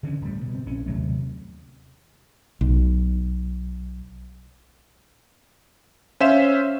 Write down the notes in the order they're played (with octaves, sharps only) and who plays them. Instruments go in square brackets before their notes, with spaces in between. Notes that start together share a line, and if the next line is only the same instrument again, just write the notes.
[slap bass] D3 E3 F3 C#4
D1 G3
B2
C4
A#1 C#4
D#2 C3 F#3 A3
[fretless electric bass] B1
[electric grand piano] C#4 C5 E5 F5 E7